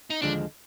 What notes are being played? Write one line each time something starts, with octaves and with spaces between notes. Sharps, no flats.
D#4
D#2 D3 F3 G#3 D4